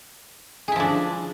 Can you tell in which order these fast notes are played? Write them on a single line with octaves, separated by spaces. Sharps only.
G#4 E4 F3 D4